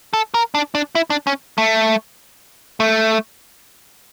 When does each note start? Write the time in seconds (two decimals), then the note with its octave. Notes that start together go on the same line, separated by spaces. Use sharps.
0.14 A4
0.34 A#4
0.55 D4
0.75 D4
0.95 E4
1.10 D4
1.27 C#4
1.58 A3
2.80 A3